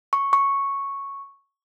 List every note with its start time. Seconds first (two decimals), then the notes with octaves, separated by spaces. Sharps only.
0.13 C#6
0.33 C#6